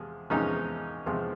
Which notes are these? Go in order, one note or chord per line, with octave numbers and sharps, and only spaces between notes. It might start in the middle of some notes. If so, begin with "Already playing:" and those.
Already playing: E2 C3 F3 G#3
E2 C3 F3 G#3 C#4 D#4
E2 C3 F3 G#3